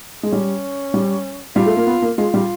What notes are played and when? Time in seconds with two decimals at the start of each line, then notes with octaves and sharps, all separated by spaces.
0.23 G#3
0.32 G3 C#4
0.94 G3
1.56 G3 F4
1.66 A3
1.77 A#3
1.86 B3
2.02 A#3
2.18 G#3 F4
2.34 G3